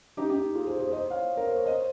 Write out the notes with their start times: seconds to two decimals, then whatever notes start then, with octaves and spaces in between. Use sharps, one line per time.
0.17 D#4 G4
0.30 D#4 G4
0.55 F4 G#4
0.67 G#4 C5
0.80 G#4 C5
0.91 C5 D#5
1.11 C#5 F5
1.37 A#4
1.47 C5
1.56 C#5
1.66 C5 D#5